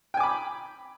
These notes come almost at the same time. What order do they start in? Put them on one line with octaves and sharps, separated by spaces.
G5 G#5 D6 B5